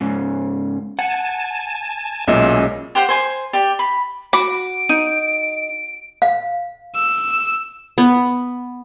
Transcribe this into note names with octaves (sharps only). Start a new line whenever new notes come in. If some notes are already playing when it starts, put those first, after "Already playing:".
G#2 C#3
F#5 G#5 A5
B1 A#2 G#3 C#4 D#5 E5
G4 C5 F#5 G5
C5 G#5 C6
G4 D5
B5
F#4 B5 D6 D7
D#4 D#7
F5
E6
B3